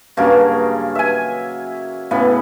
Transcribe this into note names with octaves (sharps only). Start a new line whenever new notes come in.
G2 C#3 F#3 A#3
E5 G#5
A2 C#3 B3